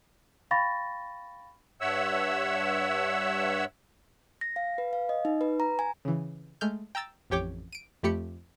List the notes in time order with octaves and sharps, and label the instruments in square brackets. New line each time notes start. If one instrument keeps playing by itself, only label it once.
[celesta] F5 G5 B5 C#6 A6 A#6
[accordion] G2 C#5 E5 F#5 E6
[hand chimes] A#6
F5
B4
F5
D#5
D#4
B4
A#5
G#5
[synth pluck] C#3 E3
G#3 A3 F6 G6
G5 A#5 E6 A6
A1 F2 G4 C#5 G5 D6
D7 D#7
F2 A3 G4 B5 C#7